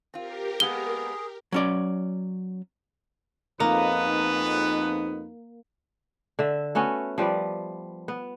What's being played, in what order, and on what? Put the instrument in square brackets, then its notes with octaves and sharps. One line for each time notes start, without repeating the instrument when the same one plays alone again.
[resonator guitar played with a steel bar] C4 F4 [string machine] G4 A#4
[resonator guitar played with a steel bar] G#3 A#3 B3 [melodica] G#4 [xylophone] G7
[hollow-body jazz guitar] F#3 C#4 D5
[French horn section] F2 D#4 [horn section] G#2 B3 B4 [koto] A#3
[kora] D3 E5
A3 B3 C#4 F#4
F3 G3 B4 D5
B3